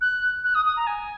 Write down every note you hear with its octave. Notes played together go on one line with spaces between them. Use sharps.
F#6
F#6
D#6
D#6
A#5
G#5